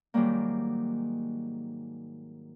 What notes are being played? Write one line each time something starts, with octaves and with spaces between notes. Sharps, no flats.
G#2 D#3 F#3 G3 A#3